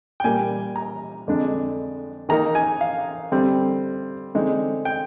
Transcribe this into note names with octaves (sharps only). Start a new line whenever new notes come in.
G5
A#2 G3 A#3 G#5
A#5
F2 D3 G#3 D4
D#3 A#3 D#4 A#5
G#5
F5
D3 G3 C4
D3 G#3 C4 D#4
G5